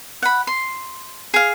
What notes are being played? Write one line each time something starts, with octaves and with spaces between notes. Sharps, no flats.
F#5 B5
C6
G#4 F5